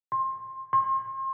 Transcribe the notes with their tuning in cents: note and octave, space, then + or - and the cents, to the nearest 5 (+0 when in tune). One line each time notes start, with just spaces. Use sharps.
C6 +20
C6 +35